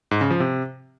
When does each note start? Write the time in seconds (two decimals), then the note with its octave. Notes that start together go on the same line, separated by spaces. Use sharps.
0.11 G#2
0.21 C#3
0.31 F3
0.40 C3